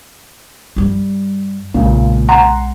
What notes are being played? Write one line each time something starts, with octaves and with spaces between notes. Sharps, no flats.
G2 G3
B1 A#2 C#3 G#3
F#5 A#5 C6